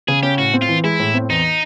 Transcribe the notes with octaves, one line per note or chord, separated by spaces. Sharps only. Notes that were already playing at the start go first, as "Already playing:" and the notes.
C#3 G#4
C#4 G4
A2 F#4
C4
F4
E3
G#3 E4
A2
C4
E2 D#4